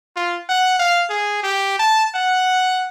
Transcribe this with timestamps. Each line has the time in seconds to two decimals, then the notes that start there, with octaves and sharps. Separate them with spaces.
0.16 F4
0.49 F#5
0.80 F5
1.10 G#4
1.43 G4
1.80 A5
2.15 F#5